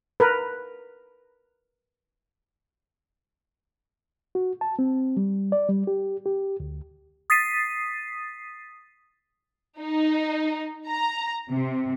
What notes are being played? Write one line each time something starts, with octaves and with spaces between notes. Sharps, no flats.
A#4 B4
F#4
A5
C4
G3
D5
G3
G4
G4
D2
D#6 A6 B6 C7 D#7
D#4
A#5
C3